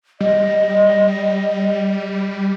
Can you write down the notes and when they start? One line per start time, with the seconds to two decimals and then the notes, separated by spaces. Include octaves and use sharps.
0.21 G3 D#5